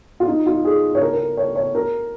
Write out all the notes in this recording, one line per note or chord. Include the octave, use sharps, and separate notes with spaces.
F4
D#4
F4
G#4
C#5
A#4
A#4
C#5
C#5
A#4